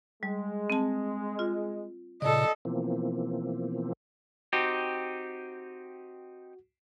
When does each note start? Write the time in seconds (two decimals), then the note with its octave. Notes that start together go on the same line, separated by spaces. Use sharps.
0.23 G3 G#3
0.70 C4 A5
1.39 F4
2.22 A#2 C#3 A4 D5 D#5
2.65 B2 E3 F3 A#3 C4
4.53 C4 D#4 F#4 G4